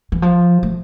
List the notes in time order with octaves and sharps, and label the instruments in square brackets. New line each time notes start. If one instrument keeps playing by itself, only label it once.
[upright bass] E3
F3
A3